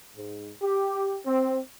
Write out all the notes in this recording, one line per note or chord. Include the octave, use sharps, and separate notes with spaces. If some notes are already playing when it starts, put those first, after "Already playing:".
G#2
G4
C4